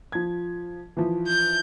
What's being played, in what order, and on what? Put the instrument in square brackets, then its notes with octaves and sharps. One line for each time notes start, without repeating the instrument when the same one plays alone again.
[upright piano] F3 G#6
E3 F3
[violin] G6